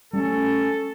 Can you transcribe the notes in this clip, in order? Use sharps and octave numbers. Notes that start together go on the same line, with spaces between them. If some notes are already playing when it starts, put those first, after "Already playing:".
G3 A3 C#4 A4